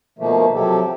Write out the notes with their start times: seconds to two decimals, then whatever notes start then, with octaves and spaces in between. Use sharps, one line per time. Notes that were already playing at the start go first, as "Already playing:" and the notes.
0.19 B2 D#3 F3 A3 A#3
0.55 C3 F3 F#3 G4 A4